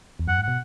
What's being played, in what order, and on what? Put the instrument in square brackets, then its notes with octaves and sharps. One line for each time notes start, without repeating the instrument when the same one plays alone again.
[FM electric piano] E2
[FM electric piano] F#2 [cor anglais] F#5
[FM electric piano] G#2
[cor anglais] F#5
[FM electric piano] B2